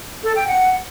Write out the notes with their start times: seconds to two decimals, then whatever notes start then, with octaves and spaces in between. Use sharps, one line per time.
0.24 A4
0.35 G5
0.47 F#5